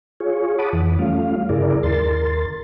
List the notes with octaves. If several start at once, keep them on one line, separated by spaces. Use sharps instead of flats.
F4 G#4 C#5
F#5 A5 B5 D6 D#6
F2 E3
G3 A3 C#4 F4 F5
G2 C#3 E4 G#4 A#4 D5
D#2 A#4 C6 A6